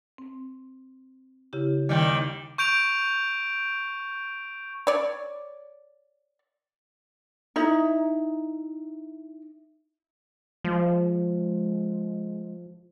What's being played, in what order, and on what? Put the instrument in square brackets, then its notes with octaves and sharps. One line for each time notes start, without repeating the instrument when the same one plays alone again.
[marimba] C4
C#3 E4 G4
[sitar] D#2 D#3 G3
[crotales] C#6 G6 D7 F7
[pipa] C#5 D5
[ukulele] D#4 E4
[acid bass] F3 [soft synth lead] G#3